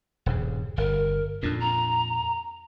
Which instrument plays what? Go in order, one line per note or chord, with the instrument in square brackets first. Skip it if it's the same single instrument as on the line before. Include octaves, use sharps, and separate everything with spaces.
[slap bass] D#1 G2 C#3
[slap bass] G1 [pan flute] A#4
[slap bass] F2 A#2 [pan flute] D4
[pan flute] A#5